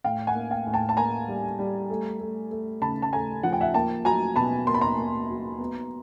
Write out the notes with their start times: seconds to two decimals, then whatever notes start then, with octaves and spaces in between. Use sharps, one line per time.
0.04 A2 F5 G5
0.27 F#5 G#5
0.35 A#3
0.51 F5 G5
0.67 A2
0.73 G5 A5
0.89 A5
0.97 A#3 G#5 A#5
1.28 G3
1.59 G3
1.90 A3
2.20 A3
2.51 A3
2.81 C#3 A5 B5
3.02 A5
3.13 A3 G#5 A#5
3.43 F3 F#5
3.53 G5
3.61 E5 F#5
3.74 A#3 G5 A5
4.05 F#3 G#5 A#5
4.36 B2 A5 B5
4.67 A#3 C6
4.74 B5
4.81 A#5 C6
4.98 A#3
5.29 F#3
5.59 B3